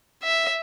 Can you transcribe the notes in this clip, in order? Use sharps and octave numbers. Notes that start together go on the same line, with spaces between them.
E5